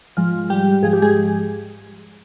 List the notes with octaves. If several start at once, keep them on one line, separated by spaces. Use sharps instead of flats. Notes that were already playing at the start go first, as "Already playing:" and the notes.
G#2 F3 G#3 F4
G3 G4
G#2 F3 G#3 G#4
G4
G#3 G#4